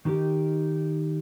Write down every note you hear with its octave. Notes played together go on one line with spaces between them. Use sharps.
D#3 D#4 G4 A#4